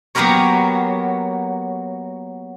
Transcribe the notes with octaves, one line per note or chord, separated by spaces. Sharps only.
F#3 A#3 B3 G4 A#4 C#5